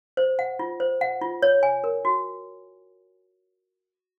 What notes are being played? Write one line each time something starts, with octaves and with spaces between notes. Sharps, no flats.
C5
F#5
F4
C5
F#5
F4
C#5
G#5
A#4
F#4